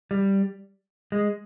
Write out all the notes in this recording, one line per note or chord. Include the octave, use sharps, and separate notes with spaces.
G3
G#3